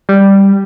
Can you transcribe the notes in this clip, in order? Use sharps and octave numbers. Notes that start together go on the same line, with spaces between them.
G3